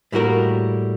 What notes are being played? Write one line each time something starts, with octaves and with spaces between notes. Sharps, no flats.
A2 G3 A#3 F#4 A#4